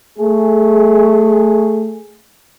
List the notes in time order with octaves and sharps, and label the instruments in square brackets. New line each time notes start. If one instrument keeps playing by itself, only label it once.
[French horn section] A3 G#4